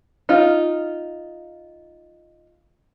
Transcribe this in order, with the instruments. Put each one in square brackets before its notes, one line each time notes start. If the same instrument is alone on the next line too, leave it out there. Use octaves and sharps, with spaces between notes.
[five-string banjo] D#4 F4